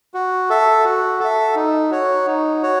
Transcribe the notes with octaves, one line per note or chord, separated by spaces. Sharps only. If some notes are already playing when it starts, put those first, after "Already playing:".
F#4
A4 E5
F#4
A4 E5
D#4
F#4 C#5
D#4
F#4 C#5